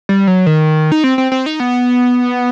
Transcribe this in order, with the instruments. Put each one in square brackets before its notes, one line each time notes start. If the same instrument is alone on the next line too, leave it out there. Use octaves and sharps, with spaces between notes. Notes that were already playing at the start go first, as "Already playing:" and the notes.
[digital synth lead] G3
F#3
D#3
D#4
C4
C4
C4
D#4
B3